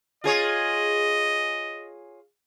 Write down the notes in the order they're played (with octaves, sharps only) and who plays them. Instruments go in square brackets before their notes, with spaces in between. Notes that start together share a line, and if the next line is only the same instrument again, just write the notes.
[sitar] F4 G#4 C#5 [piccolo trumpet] D#5